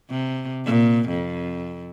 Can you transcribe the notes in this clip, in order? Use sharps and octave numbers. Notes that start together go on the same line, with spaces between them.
C3
A#2
F2